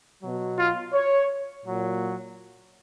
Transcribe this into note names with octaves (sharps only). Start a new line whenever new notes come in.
B2 F#3
F4
C#5
A#2 F#3